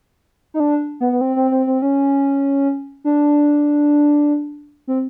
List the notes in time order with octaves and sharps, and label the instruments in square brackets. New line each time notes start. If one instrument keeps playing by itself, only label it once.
[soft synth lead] D#4
D4
B3
B3
C4
C4
C4
C4
C#4
D4
C4